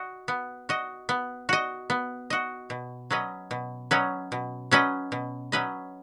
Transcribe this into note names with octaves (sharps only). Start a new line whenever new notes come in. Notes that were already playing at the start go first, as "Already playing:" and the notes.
Already playing: F#4 D#5
B3
F#4 D#5
B3
F#4 D#5
B3
F#4 D#5
B2
F#3 C#4 B4 D#5
B2
F#3 C#4 B4 D#5
B2
F#3 C#4 B4 D#5
B2
F#3 C#4 B4 D#5